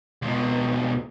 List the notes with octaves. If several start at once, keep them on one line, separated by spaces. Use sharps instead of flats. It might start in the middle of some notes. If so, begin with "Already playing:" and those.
C#2 B2